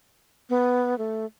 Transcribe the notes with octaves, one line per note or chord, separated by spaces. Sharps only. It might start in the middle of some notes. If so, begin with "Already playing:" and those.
B3
A3